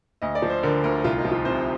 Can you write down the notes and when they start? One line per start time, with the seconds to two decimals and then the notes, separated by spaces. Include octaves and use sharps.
0.22 D2 D#5
0.35 D5
0.42 F3
0.50 C5
0.63 D3 A#4
0.84 D2 A#4
1.04 C2 F4
1.18 D#4
1.25 F3
1.32 F4
1.45 C3 C5